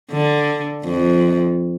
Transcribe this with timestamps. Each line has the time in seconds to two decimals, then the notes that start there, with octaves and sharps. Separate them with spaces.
0.12 D3
0.84 F2